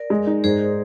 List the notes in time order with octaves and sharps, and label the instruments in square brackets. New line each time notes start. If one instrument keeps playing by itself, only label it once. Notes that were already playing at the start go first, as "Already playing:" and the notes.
Already playing: [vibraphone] A#4 D5
[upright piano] G#3
D#4
[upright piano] G#2 [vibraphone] G#4 C5